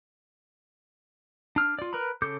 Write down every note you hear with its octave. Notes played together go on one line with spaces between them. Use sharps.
D4 F6
F4 D5
A#4 B4 A#5 B5
C#3 A4 D6 G6